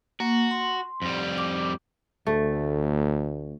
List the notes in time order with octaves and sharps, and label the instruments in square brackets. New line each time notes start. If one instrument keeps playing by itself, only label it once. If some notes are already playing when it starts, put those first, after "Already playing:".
[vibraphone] A#3 [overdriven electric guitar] F#4
[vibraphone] C6
[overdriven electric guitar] F2 G3
[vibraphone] D6
[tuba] D2 [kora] A3